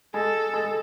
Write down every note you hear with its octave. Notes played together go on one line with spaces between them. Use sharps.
G#3 A4
G#3